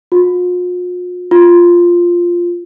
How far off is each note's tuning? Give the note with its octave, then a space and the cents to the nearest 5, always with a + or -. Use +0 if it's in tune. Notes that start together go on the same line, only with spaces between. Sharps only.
F4 +45
F4 +0